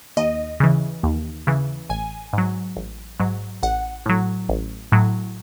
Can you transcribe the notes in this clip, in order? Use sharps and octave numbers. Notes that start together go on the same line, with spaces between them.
D#2 D#5
C#3 E3
D#2
C#3 E3
A1 G#5
G#2 F#3
A1
G#2 F#3
A1 F#5
A2 F#3
A1
A2 F#3